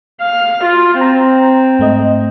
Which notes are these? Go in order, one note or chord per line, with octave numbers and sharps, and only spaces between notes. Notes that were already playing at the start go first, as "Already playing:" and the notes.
F5
F4 A6
C4 A#5
G#2 A3 D#5